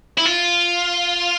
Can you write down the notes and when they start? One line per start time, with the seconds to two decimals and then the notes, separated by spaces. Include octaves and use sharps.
0.18 E4
0.25 F4